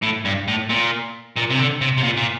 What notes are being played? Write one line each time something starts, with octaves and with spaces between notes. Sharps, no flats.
A2
G2
A2
A#2
A#2
C3
D3
C3
C3
A#2
A#2